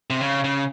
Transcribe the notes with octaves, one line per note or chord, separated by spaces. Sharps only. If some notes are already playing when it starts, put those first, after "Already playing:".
C3
C#3
C#3